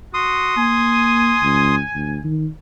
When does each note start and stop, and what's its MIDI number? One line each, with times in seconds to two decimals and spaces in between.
0.14 0.54 66
0.14 1.75 84
0.14 1.75 87
0.57 1.37 58
0.57 2.27 80
1.42 1.81 37
1.94 2.18 38
2.24 2.48 51